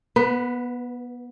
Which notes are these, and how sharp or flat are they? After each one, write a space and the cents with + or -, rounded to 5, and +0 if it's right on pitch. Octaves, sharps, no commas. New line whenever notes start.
B3 -20 B4 +15